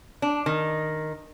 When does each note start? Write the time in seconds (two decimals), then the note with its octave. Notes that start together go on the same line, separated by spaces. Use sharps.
0.22 D4
0.46 D#3